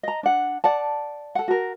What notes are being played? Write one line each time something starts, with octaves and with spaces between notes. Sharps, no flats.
D#5 A#5
D4 F#5
D5 F#5 A5
A4 F#5
F#4 A#4